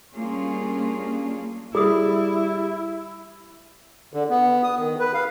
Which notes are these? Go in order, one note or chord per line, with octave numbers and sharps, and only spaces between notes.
G3 A#3 C#4 D4 F4 G#4
G3 E4 G#4 D#6
D3
B3
D#6
D#3
B4
F5